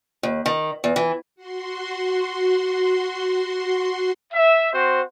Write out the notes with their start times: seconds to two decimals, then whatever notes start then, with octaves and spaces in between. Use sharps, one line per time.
0.23 D#2
0.46 D#3
0.84 E2
0.96 E3
1.36 F#4 C6
4.34 E5
4.73 C4 F#4 C5